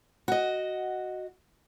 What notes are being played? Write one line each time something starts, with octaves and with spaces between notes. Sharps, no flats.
F#4 D#5